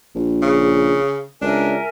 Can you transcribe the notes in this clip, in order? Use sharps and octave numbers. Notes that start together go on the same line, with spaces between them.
A#1
C#3
C#2 D4 A#4 E5 G#5